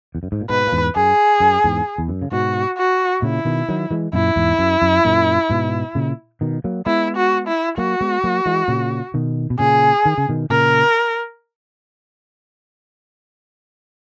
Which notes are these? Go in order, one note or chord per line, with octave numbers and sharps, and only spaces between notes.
E2
F#2
G#2
A#2
G#2 B2 B4
A#2
E2 G#2
F#2 G#4
F#2
E2 G#2
E2
F#2
C#3
G#2 B2 F#4
F#4
A#2 C#3 E4
B2 D#3
D#3 F#3
E3 G#3
F#2 A#2 E4
E2 G#2
F#2
F#2
F#2 A#2
G#2 B2
A#2 C#3
B2 D#3
F#3 A#3
G#3 B3 E4
F#4
E4
F#3 A#3 F#4
G#3 B3
F#3 A#3
E3 G#3
A#2 C#3
B2 D#3
B2
A#2 C#3 G#4
D#3
C#3
B2 D#3
A#2 C#3 A#4